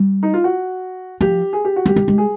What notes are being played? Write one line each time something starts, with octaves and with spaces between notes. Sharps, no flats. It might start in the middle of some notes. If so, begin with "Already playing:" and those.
Already playing: G3
D#4
F4
F#4
F3 G4
G#4
G4
F#4
F#3 G4
G#3
G#3
G#4